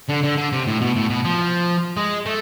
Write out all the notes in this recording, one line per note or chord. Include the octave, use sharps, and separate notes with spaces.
D3
D3
D3
C3
A2
B2
A2
B2
F3
G#3
A3